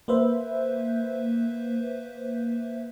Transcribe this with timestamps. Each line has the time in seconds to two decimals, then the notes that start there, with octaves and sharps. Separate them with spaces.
0.08 A#3 B4 C5 E5